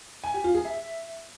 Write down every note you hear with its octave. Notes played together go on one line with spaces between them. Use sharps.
G#5
G4
F4
G#4
E5